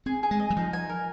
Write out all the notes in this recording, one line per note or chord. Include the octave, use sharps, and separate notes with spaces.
C4 G#4
G#4
G#3
D#5
F#3
F3 D#4
G#5
A#4